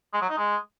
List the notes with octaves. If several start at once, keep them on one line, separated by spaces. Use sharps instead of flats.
G#3
F#3
D#4
G#3